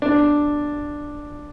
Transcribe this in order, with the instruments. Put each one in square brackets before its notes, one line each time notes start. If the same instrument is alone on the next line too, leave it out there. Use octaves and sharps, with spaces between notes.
[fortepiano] D4